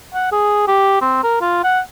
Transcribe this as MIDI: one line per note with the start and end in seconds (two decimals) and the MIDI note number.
0.14 0.31 78
0.32 0.66 68
0.67 1.01 67
1.01 1.19 60
1.23 1.38 70
1.41 1.63 65
1.64 1.80 78